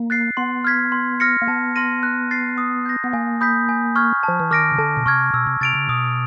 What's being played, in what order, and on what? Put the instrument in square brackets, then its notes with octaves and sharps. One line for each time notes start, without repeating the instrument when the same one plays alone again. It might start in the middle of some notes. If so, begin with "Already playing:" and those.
Already playing: [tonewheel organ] A#3
[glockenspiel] F#6 A6 C7
[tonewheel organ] B3 [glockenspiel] C6
[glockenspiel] F6 G#6 B6
C6
F6 A#6 C#7
[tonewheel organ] A#3
[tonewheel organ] B3 [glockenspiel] A5
[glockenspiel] C6 F6 A#6 D#7
F#6
A6 C7
D#6
G6 A#6
[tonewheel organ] B3
[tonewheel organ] A#3 [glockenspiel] G#5
[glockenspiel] B5 D#6 G6 B6
G#5
C#6 F6 G#6
A5
[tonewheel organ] F3
E3
[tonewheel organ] D#3 [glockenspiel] D6 F6 A#6 D7
[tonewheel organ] C#3
[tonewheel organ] D3 [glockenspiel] A5
[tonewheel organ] B2
[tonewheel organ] C3 [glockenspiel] C#6 F6 G#6
[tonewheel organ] B2 [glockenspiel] E6
[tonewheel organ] C3
[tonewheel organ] C3 [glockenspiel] A6 D7 F7
[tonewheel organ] C#3
[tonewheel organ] B2 [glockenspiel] D#6